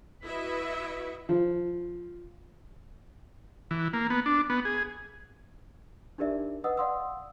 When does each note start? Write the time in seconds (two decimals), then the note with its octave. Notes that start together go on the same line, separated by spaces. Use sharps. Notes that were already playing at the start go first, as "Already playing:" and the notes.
0.24 E4 F#4 B4 D#5 E5
1.29 F3
3.71 E3
3.93 A#3
4.10 B3
4.26 D4
4.50 B3
4.65 G#4
6.18 D4 D#4 G4 A#4 D5 E5
6.64 B4 D#5 F#5 D#6 E6
6.77 D5 F5 F#5 C6 D#6 E6